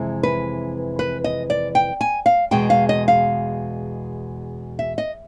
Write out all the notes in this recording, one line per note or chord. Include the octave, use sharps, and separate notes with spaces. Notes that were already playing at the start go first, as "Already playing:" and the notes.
Already playing: F2 C3 E3 G#3
B4
B4
D#5
D5
G5
G#5
F5
E2 B2 G#3 G5
F5
D#5
F5
E5
D#5